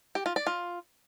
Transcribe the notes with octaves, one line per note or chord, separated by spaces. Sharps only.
G4
F4
D5
F4